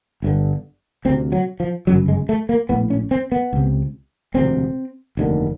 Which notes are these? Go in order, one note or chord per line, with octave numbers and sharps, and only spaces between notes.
G1 G2 D3
D2 C3 C4
F#3
F3
G1 F#2 C#3 F#3
G#3
A3
A#3
A#1 A2 B3
C#4
C4
B3
C#2 C3
E1 D2 C3 C4
F1 D#2 D3